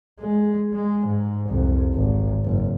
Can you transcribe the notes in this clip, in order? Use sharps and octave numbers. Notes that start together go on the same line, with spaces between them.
G#3
G#3
G#2
C2 F2
G#1
F#1